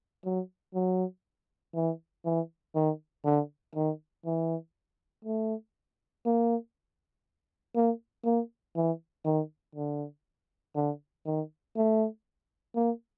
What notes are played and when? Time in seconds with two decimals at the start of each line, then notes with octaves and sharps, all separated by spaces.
0.25 F#3
0.74 F#3
1.75 E3
2.25 E3
2.75 D#3
3.25 D3
3.75 D#3
4.26 E3
5.25 A3
6.26 A#3
7.75 A#3
8.25 A#3
8.76 E3
9.25 D#3
9.75 D3
10.75 D3
11.26 D#3
11.77 A3
12.76 A#3